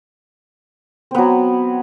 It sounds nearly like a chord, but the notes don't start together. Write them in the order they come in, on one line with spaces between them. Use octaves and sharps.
C4 B3 F#3